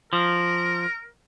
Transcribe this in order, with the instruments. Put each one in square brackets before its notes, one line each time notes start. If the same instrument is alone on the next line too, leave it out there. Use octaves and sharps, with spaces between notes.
[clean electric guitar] F3 [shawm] A#4